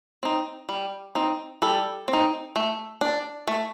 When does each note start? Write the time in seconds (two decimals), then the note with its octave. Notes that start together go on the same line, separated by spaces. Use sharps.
0.23 C4 D#4
0.69 G3
1.15 C4 D#4
1.62 G3 A4
2.08 C4
2.13 D#4
2.56 A3
3.01 D4
3.47 A3